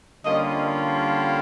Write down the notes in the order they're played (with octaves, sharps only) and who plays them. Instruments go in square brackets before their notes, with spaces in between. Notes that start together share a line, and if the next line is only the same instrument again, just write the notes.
[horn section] D3 G3 A#3 C#4 F4 D#5